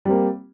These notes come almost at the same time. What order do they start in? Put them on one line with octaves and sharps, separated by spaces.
G3 C4 A#3